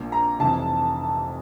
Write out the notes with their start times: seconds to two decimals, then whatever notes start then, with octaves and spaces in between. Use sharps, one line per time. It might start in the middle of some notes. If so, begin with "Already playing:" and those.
Already playing: A#1 A#2
0.12 A#5
0.39 F1 F2 C3 E3 A5